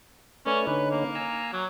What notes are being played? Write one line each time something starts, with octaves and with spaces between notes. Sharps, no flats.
A3 C#4 B4 D5
D3 C#4 D#4 B4
A#3
G#5 A#5 E6
F#3